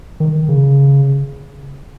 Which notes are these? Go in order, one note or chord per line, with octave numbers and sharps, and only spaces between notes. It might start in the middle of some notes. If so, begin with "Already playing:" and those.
D#3
C#3